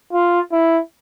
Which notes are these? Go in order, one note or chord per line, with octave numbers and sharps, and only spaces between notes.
F4
E4